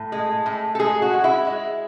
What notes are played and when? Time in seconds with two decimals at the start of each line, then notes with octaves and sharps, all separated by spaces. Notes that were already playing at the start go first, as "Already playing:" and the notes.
Already playing: A2
0.12 G#3
0.46 A2
0.75 A4
0.79 G#3 G#4
1.02 F#4
1.13 G#3
1.24 E4
1.47 G#3